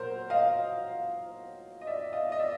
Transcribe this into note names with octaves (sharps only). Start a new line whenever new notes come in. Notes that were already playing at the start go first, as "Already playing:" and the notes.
Already playing: A#2 F#3 A#4 C5
D#5 F5
D#5
D5 E5
D#5 F5
D#5
D5 E5